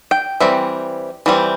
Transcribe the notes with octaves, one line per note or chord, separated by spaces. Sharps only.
G5
E3 G3 C4 E5
E3 G3 C4